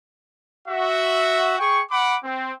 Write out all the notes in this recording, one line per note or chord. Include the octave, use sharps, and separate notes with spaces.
F#4 E5
G#4 G5 C#6
F#5 B5 D6
C4